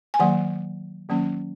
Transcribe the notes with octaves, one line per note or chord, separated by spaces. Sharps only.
G#5
D#3 F#3 A#3 F#5
D#3 F#3 A#3 C#4